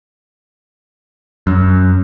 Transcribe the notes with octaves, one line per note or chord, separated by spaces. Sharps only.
F#2